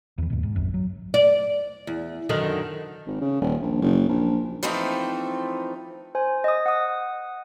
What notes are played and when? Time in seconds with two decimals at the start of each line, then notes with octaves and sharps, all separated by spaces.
0.18 E2 E3
0.30 D#2 G#2 B2
0.43 G#2
0.56 D1 A#1 F#2
0.74 F#3
1.14 D5
1.87 E2
2.29 F#2 D3 D#3
3.07 G#1
3.21 C#3
3.41 D#1
3.62 A#1
3.81 F#1
4.09 A#1
4.63 E3 F3 A3 C4 D#4
6.15 C5 G#5
6.44 D#5 D#6
6.66 F#5 D#6